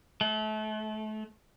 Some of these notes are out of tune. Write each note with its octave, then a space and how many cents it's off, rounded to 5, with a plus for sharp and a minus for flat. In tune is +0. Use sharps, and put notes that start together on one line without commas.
A3 -30